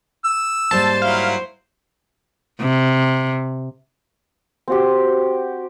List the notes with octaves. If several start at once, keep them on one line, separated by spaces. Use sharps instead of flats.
E6
G#2 G3 A#3 C5 A5
F#3 E4 F5
C3
C4 F#4 G4